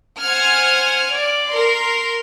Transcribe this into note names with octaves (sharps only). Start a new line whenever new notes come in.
C5 F#5 G#5 F6 G#6
D5
A#4 C6